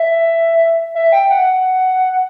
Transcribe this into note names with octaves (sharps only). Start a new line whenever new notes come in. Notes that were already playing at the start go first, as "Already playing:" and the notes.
Already playing: E5
E5
G5
F#5